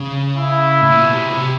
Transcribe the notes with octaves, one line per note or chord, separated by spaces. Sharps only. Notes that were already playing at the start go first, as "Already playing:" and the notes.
Already playing: C#3
E4
A2
A#2
B2
C3
B2
C3